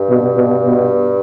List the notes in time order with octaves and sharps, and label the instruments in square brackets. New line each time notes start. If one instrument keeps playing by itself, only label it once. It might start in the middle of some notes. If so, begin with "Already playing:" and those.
Already playing: [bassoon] G2
[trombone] B2
B2
B2